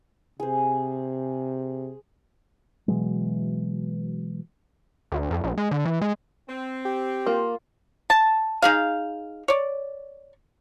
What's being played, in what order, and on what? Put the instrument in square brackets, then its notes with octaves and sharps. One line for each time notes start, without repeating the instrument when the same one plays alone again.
[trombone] C3 [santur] G#4 C5
[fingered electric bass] B2 E3 F#3 G#3
[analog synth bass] D2
F2
A#1
G#3
D3
E3
G#3
[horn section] C4
[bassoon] G4
[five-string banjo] A#3 [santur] F4
[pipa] A5
D#4 G#4 F5
C#5 D5